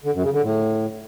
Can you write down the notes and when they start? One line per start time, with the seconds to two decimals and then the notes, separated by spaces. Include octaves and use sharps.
0.04 D3
0.14 F#2
0.23 C#3
0.33 D3
0.42 A2